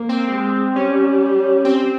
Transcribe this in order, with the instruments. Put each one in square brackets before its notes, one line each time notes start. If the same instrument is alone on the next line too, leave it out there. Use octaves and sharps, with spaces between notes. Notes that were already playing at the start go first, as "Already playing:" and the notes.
Already playing: [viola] A#3
[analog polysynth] C4
[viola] G#3
[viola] G3 [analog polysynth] C#4
[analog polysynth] C4